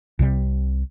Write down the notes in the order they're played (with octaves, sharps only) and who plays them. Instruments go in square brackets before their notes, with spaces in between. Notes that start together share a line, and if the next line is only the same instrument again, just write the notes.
[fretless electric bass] C2 C3 G3